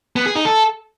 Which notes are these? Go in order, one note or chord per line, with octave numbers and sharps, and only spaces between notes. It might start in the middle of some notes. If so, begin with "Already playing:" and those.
B3
G#4
D#4
A4